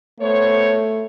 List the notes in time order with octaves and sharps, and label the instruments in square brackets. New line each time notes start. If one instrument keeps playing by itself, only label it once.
[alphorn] A3 [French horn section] B3 C5 C#5